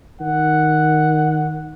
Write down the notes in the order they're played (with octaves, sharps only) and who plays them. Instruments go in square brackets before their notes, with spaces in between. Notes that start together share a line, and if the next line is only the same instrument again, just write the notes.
[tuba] D#3 [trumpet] F#5